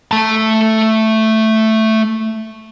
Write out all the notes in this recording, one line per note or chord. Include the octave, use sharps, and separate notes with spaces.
A3 A5